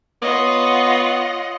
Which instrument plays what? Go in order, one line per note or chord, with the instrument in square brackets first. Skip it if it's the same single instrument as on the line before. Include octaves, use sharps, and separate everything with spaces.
[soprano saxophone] B3 [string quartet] F4 F#5 [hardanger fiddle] C#5 [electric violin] D#5